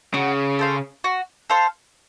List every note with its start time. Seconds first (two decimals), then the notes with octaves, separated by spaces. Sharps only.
0.14 C#3 F#4
0.59 A4 C5 F5
1.04 F#4
1.50 A4 C5 F5